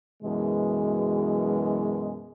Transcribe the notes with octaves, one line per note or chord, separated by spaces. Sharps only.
F#2 B2 E3 G#3